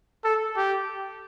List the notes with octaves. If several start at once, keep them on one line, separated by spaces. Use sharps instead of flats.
A4
G4